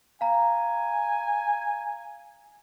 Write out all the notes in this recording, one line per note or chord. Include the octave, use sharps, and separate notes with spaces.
F5 G#5 A#5